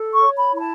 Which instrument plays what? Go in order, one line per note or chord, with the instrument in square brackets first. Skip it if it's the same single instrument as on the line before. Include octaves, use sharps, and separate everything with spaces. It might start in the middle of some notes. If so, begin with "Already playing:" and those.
Already playing: [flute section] A4
C#6
C#5
B5
E4 B5
A5